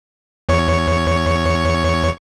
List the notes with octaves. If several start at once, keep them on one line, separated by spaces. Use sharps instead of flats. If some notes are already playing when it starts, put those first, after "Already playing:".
E2 C#5 C#6